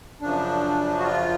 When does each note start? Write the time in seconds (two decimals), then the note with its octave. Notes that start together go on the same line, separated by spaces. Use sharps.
0.21 F#2 C#3 F3 D4
0.99 F#4
1.02 F4